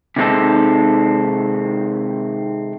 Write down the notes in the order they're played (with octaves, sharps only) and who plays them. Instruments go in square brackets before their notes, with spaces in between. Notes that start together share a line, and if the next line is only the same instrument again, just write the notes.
[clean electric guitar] C3 D#3 G#3 C4 D#4 A4